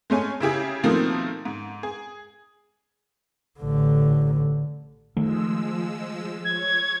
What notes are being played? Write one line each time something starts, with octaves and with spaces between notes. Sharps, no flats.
G#3 A3 C#4 G#5
C#3 E4 G4 G#4
B2 D#3 F3 A3 A#3 C4
G#2
G#4
A1 D3
D#3 F3 G#3 A3 E6
C#5 G#6